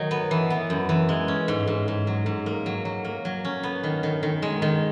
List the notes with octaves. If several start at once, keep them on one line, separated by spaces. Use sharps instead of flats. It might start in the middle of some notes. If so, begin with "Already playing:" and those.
Already playing: D#3 F#3 D#4
B3
E3
B3
F#2
E3
G#3
C#4
G#2
G#2
G#2
F#3
G#2
A#3
F#3
F#3
A#3
F#3
C#4
B3
D#3
D#3
D#3
G#3
D#3